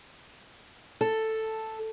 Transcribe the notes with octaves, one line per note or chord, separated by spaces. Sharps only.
A4